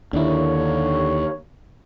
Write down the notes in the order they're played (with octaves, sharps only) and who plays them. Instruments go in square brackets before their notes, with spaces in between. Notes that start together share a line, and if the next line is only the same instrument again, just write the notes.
[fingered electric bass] D#2 D#3 [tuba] D3 [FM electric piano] D4 E4 [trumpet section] C#5